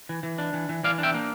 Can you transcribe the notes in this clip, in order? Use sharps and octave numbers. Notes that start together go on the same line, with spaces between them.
E3
E3
D4
E3
E3
E3 D5 F5
D4
E5 G5
A#3